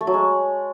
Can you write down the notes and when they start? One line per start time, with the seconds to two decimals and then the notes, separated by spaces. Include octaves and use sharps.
0.01 A3
0.07 F#3
0.14 G#3